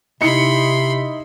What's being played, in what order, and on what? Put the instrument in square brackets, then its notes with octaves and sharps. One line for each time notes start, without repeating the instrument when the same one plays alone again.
[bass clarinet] C3 [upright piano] D#4 E4 C#7 [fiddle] B5 C6